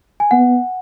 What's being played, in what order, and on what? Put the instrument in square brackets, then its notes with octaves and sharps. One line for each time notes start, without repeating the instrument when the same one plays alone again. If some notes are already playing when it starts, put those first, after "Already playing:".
[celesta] G#5
[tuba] B3 [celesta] F#5